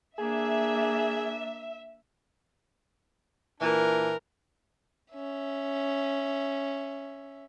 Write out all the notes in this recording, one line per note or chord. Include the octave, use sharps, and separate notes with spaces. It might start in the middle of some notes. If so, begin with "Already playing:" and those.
A#3 D4 G#4 E5
A#2 E3 D4 A#4
C#4 E5